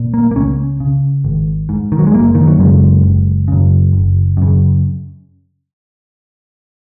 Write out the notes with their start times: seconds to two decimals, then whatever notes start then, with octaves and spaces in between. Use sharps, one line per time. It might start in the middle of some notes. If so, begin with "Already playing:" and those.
Already playing: A#2
0.14 A#3
0.31 A#3
0.35 C#2 C#4
0.80 C#3
1.25 G#1
1.69 G#2
1.92 D#3
1.99 F#3
2.07 G#3
2.14 F#1 A#3
2.35 D#3
2.47 F#3
2.59 F#2 C#3 G#3
3.04 F#1
3.48 F#2 C#3
3.93 F#1
4.37 F#2 C#3